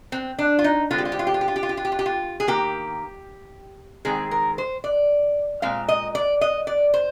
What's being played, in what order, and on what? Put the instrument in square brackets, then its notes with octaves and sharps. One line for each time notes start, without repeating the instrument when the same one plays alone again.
[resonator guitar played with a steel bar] C4
D4
F4
D#4
D3 G#3 C4 F4
G4
F4
G4
F4
G4
F4
G4
F4
G4
F4
G4
F4
G4
F4
G4
F4
G#4
D#3 A#3 G4
D#3 G#3 C4 G#4
A#4
C5
D5
A#2 G#3 C4 F5
D#5
D5
D#5
D5
C5